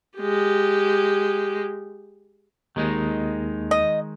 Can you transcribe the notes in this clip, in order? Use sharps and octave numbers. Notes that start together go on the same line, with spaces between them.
G#3 G4
D#2 D#3 G#3 D#4
D#5